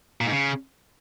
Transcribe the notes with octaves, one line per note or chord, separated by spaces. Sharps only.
A#2
G#2
C#3